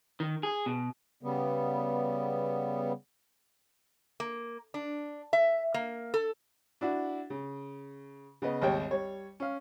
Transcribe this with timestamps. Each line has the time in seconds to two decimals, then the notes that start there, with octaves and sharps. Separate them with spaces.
0.20 D#3
0.43 G#4
0.66 B2
1.23 C#3 G3 B3
4.20 A#3
4.74 D4
5.33 E5
5.74 A#3
6.14 A4
6.81 D4 E4 F#4
7.30 C#3
8.42 C#3 B3 D#5
8.62 G#1 D#2 G3 C#5 G5
8.91 G3 C#5
9.40 C#4 F5